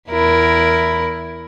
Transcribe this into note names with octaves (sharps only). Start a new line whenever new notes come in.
E2 E4 A#4